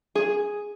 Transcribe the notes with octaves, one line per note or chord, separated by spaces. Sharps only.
G#4